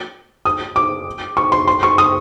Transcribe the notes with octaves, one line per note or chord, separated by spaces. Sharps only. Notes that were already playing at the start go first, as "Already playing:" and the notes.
D#6
D6
C#6
C6
C6
C#6
D#6